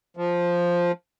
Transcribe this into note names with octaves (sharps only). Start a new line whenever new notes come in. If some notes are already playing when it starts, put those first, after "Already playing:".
F3